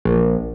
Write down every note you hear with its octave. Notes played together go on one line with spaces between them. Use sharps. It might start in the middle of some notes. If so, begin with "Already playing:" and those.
A#1